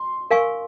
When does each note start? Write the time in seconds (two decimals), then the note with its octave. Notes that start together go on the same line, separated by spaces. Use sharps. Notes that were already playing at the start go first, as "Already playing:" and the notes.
Already playing: C6
0.31 A#4 F5 G#5 C#6